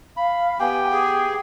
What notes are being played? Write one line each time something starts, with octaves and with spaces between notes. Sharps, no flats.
F5 B5
B3 G4 G5 G#5
G#4